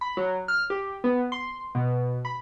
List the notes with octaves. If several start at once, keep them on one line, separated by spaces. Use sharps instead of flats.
B5
F#3
F6
G4
B3
C6
B2
B5